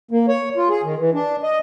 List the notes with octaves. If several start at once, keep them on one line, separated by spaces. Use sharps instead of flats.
A#3
C#5
F4
G#4
D#3
E3
D4
D#5